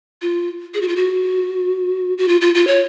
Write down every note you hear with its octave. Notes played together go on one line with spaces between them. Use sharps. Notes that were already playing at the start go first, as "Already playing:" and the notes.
F4
G#4
F#4
F4
F#4
F#4
F4
F4
F4
C#5